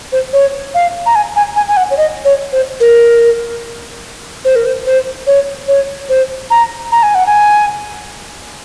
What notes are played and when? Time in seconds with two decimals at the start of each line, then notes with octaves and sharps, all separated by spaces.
0.12 C5
0.33 C#5
0.74 F5
1.06 A#5
1.15 G#5
1.36 G#5
1.56 G#5
1.68 G#5
1.77 F#5
1.91 C#5
1.97 D#5
2.25 C#5
2.52 C5
2.80 A#4
4.45 C5
4.56 A#4
4.66 C5
4.86 C5
5.27 C#5
5.68 C#5
6.09 C5
6.50 A#5
6.92 A#5
7.03 G#5
7.15 F#5
7.26 G#5